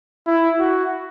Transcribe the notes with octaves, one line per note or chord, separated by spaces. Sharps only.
E4
F#4